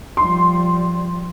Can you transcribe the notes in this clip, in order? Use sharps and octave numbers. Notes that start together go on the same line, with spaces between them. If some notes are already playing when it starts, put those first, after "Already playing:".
F3 G3 C6